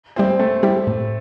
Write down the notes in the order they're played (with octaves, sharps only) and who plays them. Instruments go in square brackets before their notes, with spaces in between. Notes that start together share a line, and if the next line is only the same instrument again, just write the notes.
[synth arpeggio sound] G3 E4 G4 [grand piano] C4
[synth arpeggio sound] C3 [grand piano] A3
[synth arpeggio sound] G3 E4 G4
A2